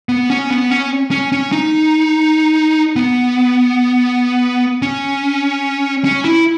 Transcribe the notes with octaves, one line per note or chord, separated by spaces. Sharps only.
B3
C#4
B3
C#4
C#4
C#4
D#4
B3
C#4
C#4
E4